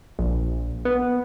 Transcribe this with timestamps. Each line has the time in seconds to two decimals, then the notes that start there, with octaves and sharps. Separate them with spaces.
0.19 A#1
0.85 B3